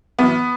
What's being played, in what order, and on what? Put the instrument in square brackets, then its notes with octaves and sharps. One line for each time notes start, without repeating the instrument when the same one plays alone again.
[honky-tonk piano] F#2 E3 B3